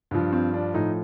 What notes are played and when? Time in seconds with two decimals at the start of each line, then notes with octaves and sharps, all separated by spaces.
0.11 G2 F3
0.33 C4
0.54 D4
0.74 A2 F3 D#4